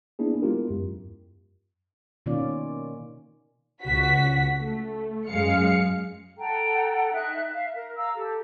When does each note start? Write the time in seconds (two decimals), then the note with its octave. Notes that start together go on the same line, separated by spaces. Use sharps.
0.19 A#3 B3 D4 E4 G#4
0.42 G#3 B3 E4 F4 G4 A#4
0.70 F#2
2.26 B2 D#3 A#3 C#4 F4 D5
3.83 C#2 F#4 B6
4.60 A3
5.28 F#2 G#3 F5 C#7
6.38 A4 F#5 G5 A#5
7.12 D#4 E5 F#6
7.51 E5 F5
7.72 A#4
7.96 F5 A#5 E6
8.16 G4 A4